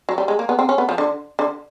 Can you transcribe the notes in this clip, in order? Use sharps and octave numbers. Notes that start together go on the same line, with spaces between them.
F#3
G3
G#3
A#3
B3
C4
C#4
B3
F3
D3
D3